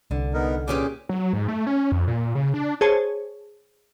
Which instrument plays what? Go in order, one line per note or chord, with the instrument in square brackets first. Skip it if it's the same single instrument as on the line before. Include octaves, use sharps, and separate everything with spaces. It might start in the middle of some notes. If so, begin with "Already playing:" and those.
[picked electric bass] C2 [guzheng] D3
[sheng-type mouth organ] B3 D#4 A#4
[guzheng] A#2 C#4 G4 [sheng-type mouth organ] G#4 D6
[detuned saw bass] F#3
G#2
A3
C#4
F2
A#2
C#3
D4
[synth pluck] G#4 C5 C#5 A5